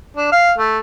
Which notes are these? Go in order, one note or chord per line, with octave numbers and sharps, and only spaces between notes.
D4
F5
A3